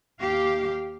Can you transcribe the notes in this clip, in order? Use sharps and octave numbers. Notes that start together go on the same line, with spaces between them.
D#2 G4 F5